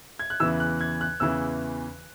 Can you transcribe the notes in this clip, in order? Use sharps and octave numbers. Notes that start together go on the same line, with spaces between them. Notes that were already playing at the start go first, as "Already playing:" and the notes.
G#6
F#6
E2 C#3 E3 E6
F#6
G#6
F#6
E2 C#3 E3 E6